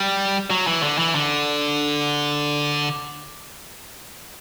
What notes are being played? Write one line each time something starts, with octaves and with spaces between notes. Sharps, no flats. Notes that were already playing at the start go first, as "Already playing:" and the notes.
Already playing: G3
F#3
E3
D3
E3
D3